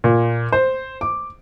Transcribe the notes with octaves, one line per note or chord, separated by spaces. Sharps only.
A#2
C5
D6